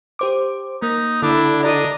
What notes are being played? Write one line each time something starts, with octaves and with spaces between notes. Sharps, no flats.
G4 C5 D6
A#3 D#4
D3 D4 E4
D4 D5 D#5 A#5